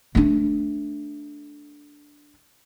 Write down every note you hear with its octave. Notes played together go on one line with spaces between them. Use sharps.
A3 D4